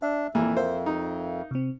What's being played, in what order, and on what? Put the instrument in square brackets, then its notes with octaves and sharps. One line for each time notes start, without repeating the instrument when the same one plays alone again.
[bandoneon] D4 [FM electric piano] E5
[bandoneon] F2 [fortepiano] A#2 E3 A#3
[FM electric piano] A#4 E5 F5 [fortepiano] C5
[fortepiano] D#4
[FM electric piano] C3 C4